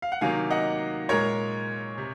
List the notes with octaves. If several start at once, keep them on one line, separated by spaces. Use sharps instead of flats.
F5
F#5
C3 D#3 F#3 A#3 F5 G#5
D#5 F#5
A#2 G#3 A#4 C#5
C3